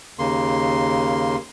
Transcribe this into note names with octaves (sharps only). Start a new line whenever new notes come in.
D#2 C#3 A#3 C6